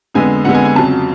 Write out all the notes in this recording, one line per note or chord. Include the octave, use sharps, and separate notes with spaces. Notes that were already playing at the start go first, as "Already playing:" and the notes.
F2 D3 G#3 B3 G#5
F2 D3 G#3 B3 F#5
G#5
G#5
F2 C#3 F#3 A5